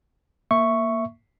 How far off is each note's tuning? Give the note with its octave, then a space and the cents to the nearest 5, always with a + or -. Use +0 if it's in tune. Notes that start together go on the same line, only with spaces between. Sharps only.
A#3 +0 E5 +5 C#6 +0